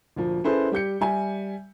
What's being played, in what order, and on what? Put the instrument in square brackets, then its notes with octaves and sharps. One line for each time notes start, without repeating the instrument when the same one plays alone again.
[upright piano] D2 A#2 F3
C#4 E4 G#4 A4 B4 C5
G3 G4 G6 C#7
G3 E5 G#5